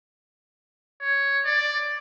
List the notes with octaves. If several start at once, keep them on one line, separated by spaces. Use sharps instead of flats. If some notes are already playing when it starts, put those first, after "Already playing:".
C#5
D5